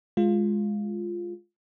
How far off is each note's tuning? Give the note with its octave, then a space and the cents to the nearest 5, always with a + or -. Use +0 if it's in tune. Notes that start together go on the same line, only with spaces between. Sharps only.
G#3 +0 F4 +0